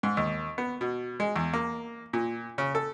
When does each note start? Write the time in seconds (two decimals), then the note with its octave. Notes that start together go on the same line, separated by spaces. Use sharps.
0.03 G#2
0.17 D#2
0.58 B3
0.81 B2
1.20 G#3
1.36 E2
1.53 A#3
2.13 A#2
2.58 C#3
2.75 A4